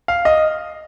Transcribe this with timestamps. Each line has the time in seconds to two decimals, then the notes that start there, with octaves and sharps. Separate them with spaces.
0.08 F5
0.25 D#5